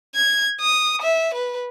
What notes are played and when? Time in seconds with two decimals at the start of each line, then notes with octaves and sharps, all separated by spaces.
0.15 G#6
0.61 D#6
1.02 E5
1.34 B4